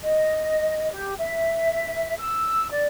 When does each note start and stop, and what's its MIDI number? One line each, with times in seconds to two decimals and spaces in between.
0.03 0.89 75
0.92 1.14 67
1.19 2.13 76
2.17 2.69 88
2.71 2.87 74